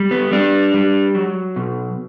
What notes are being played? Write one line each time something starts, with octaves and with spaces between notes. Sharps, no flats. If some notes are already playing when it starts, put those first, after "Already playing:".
Already playing: G3
B3
G3 D4
G3
F#3
B2